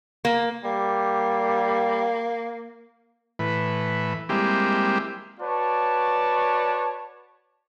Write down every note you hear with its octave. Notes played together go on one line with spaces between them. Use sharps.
A#3
G3 A#3
A2 E3 B4
G3 G#3 A#3 C4 E4 G4
F#4 B4 C#5 D5 A5